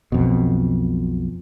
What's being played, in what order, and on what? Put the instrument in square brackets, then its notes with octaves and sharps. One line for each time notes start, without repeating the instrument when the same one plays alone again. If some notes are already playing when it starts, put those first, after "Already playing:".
[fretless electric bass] B1 F2 B2